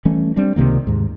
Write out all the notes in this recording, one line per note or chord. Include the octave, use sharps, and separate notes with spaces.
E3 G3 A3 C#4
G3 C4 D4
C#2 C3 D#3 A#3
D#2 G#2